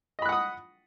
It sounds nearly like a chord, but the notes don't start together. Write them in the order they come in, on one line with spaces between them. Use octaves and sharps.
D#5 B5 F#6 F#5 D#6